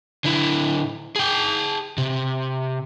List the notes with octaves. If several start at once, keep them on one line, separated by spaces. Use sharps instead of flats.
D3 E4
G#4 G5
C3